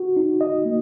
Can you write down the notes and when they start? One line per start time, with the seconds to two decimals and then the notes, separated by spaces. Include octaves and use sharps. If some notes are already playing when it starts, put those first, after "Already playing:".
Already playing: F#4
0.17 D#4
0.41 D#5
0.66 A#3